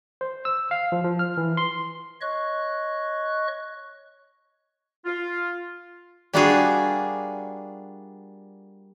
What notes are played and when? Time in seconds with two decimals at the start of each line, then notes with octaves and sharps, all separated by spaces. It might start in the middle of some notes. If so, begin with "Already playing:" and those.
0.21 C5
0.45 E6
0.71 F5
0.92 F3
1.04 F3
1.19 F6
1.37 E3
1.57 C6
2.21 C#5 D#5 C#6 F#6
5.05 F4
6.33 G3 A#3 D4 F4 F#4 G#4